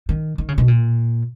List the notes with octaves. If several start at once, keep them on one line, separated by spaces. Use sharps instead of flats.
D#3
D#3
C#3
B2
A#2